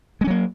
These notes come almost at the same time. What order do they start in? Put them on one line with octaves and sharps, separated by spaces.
G#3 C#4 F#3 A#3